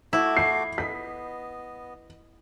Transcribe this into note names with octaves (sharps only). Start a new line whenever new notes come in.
A3 E4 F#4 D6
C7
B3 D#5 B6